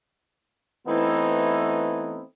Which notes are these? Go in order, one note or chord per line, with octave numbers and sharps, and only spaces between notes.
E3 A3 B3 C4 D#4 E4